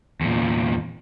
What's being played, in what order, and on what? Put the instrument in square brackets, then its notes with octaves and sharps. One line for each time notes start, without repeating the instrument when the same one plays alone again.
[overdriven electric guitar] E2 A#2